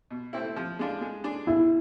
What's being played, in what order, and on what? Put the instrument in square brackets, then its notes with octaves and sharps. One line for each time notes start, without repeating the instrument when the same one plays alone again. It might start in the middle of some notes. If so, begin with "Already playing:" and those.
[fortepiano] B2
A3 C4 E4
F3
G#3 D4 F4
G#3
D4 G#4
[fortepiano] B2 [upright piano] E4